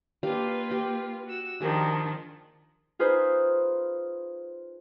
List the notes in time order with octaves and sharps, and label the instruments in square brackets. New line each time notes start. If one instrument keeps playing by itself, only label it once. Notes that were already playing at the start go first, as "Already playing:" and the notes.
[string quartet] A#3 F4 B4 [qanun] D4 G4 F5
[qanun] G4 G5
[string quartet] F#4 E6
[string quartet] D#3 F3 D4 [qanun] G4 G#4 A#4
[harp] D#4 F4 G#4 B4 C5